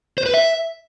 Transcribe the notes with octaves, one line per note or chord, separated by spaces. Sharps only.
C5
B4
E5